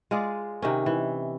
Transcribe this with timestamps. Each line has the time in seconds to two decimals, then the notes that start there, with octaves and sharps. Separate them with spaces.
0.11 G#3 F4 G#4 D5
0.62 C3 D#3 C#4
0.86 E3